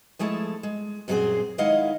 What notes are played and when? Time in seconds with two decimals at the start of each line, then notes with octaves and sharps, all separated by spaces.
0.19 F3 G#3 A3 E4 A5
0.63 G#3
1.08 F#2 A#2 F#3 C4 G#4 C5
1.58 D#3 G#3 E4 D#5 F5 F#5